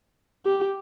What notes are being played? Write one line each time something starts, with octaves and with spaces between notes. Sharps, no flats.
G4